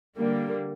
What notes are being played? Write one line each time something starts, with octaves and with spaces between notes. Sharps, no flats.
D3 G3 A#3